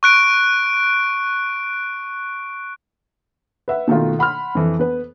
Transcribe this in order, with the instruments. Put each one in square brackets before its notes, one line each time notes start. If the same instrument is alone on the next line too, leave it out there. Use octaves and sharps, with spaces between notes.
[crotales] C#6 F#6 D7
[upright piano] B4 E5 F#5
B2 D#3 A3 F4
F#5 B5 C6 F6
F2 E3
B3 B4